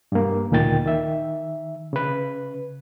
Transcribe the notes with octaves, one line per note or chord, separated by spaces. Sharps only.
G2 A#3
D2 A#2 D#3 G5 A6
D#3 E5
C#3 B4